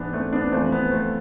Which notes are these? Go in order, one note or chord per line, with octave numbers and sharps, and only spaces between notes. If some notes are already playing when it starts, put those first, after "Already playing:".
Already playing: G#2 E3 B3 D4
A3 C4
B3 D4
F2 E3 A3 C4
B3
A3 C4